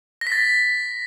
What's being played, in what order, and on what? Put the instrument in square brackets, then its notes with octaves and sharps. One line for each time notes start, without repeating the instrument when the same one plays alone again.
[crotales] A#6
B6
A6